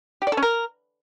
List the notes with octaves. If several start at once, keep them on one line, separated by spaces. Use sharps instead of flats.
G4
D5
A4
C#4
A#4